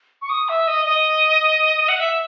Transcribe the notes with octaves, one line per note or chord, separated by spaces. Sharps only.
C#6
D#6
E5
D#5
D#5
F#5
E5